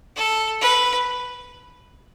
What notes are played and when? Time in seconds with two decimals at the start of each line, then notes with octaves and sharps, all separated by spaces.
0.16 A4
0.62 B4